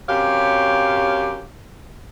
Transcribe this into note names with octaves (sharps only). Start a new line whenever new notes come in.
F#2 C3 G4 C#5 F5